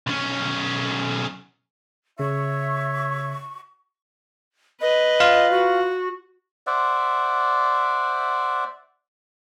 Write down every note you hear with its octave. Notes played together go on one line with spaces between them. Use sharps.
B1 C#4
C#3 C#5 E5 C#6
B4 D#5
F4 F5
F#4
C5 D5 E5 F#5